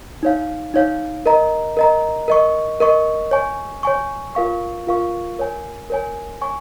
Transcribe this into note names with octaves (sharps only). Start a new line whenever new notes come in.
D#4 C#5 F5
D#4 C#5 F5
A#4 D#5 A#5
A#4 D#5 A#5
A#4 D#5 C#6
A#4 D#5 C#6
C#5 G#5 C#6
C#5 G#5 C#6
F4 A#4 F5 C#6
F4 A#4 F5 C#6
A#4 C#5 G#5
A#4 C#5 G#5
C#5 G#5 C#6